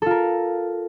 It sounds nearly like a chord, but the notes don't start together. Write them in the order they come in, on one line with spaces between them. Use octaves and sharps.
A4 F4 A#4